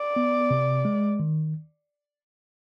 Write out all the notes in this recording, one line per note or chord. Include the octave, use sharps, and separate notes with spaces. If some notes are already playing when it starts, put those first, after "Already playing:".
Already playing: D5
B3
C3
G#3
D#3